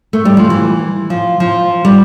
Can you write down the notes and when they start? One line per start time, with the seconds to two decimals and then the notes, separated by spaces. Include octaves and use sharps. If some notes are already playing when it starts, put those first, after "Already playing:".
0.13 A3
0.25 G3
0.37 F3
0.50 E3
1.10 F3
1.40 F3
1.85 G3